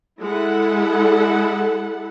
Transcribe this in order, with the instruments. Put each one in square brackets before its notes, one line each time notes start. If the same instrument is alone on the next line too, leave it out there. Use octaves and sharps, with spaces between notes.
[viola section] G#3 E4 A4 F#5